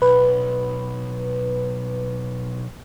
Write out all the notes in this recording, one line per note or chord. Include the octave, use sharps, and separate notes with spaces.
B1 B4